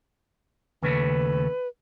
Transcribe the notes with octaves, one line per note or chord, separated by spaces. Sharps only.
D#2 C#3 A3 B4